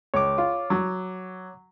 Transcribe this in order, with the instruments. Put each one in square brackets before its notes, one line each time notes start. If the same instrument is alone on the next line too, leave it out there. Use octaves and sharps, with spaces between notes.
[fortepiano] C#2 [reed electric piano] C#5 D6
[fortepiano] F4
F#3